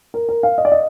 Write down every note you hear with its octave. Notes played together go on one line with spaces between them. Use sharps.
A#4
A#4
F5
D#5
D5
D#5